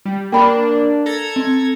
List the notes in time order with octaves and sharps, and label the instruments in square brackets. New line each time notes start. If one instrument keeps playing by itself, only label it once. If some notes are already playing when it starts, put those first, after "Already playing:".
[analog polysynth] G3
[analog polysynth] A#3 D4 [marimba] G5 B5
[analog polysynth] A4 A#5 G#6
[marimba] C4